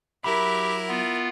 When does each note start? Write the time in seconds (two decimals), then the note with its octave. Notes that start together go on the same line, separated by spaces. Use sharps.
0.24 F#3 E4 G4 A#4 E5 B5
0.89 B3 F4